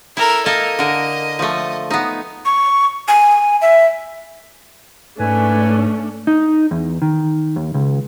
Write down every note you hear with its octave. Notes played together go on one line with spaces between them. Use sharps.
E4 A4 A#4
A#3 A4 A#4 D#5
D3 A#4
F3 A3
B3 D#4
C#6
G#5
E5
G#2 A3 C#4 D4 B4 G#5
D#4
E2
D#3
D#2
C#2